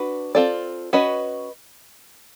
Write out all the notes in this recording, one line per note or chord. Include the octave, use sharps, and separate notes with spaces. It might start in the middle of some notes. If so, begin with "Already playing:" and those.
Already playing: D4 F#4 B4
C4 F4 A4 D5
C#4 F#4 B4 D#5